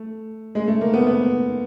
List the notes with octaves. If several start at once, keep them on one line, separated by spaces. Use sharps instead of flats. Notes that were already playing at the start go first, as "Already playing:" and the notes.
Already playing: A3
G#3
A3
A#3
B3
B3